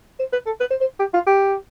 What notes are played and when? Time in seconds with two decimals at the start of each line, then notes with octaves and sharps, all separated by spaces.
0.19 C5
0.33 B4
0.46 A4
0.60 B4
0.70 C5
0.81 C5
1.00 G4
1.14 F4
1.27 G4